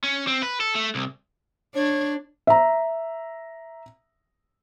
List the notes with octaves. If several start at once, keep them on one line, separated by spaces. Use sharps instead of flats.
C#4
C4
B4
A4
A3
C2
D4 C#5
E5 A#5